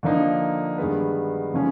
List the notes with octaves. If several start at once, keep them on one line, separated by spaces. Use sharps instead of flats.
D3 F3 A#3 D#4
G2 D#3 G#3 B3
C#3 F3 A3 C#4